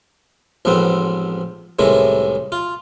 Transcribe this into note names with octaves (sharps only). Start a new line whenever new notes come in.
A1 F2 G#2 B3 C4
C2 A2 D#3 E3 G#3
F4